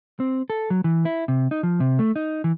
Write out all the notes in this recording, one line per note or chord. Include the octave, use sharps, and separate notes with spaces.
C4
A4
F#3
E3
E4
C3
D#4
F3
C3
A3
D#4
E3